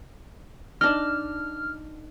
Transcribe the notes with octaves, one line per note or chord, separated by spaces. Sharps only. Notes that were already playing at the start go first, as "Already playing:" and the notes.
D4 D#4 F6